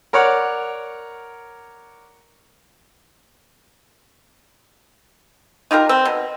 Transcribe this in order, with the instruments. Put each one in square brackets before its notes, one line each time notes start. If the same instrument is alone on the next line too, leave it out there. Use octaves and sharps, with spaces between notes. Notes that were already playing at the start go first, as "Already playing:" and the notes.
[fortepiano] A#4 C#5 D5 F#5
[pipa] D#4 F4 G4 A#4
C4
B2